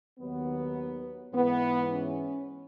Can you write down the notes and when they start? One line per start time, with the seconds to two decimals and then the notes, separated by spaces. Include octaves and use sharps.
0.19 D#2 D#3 F#3 B3
1.33 G#2 E3 B3
1.90 C#4